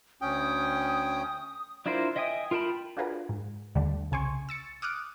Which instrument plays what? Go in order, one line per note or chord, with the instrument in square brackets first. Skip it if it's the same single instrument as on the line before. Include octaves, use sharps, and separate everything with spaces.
[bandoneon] D2 C#4 G5 [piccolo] D#6
[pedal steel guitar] D4 E4 F4 A#4 C5
D#5 E5 G5 G#5 D#6
F4 A#4 G5 A5 B5
[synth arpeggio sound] D4 F4 F#4 G#4 A#4 B4
G#2
D#2 D3 G3 A3 D4
C2 C#3 G#5 C6 C#6
E6 A6 C#7
D6 D#6 F6 F#6 D7